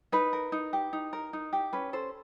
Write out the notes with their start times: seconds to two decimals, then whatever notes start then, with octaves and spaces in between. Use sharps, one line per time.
0.12 D#4 B4
0.33 A#4
0.52 D#4
0.73 G4
0.93 D#4
1.13 A#4
1.33 D#4
1.53 G4
1.73 C#4 B4
1.93 A4 C5